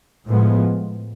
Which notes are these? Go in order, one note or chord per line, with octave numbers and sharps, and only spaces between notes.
A2 F3 G#3 B3